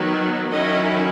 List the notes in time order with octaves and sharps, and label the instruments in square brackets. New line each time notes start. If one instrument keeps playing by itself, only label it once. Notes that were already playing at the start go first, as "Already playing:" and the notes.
Already playing: [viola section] D#3 F#3 B3
D#3 F#3 C#4 E4 D#5